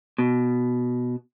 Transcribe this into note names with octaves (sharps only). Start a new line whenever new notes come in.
B2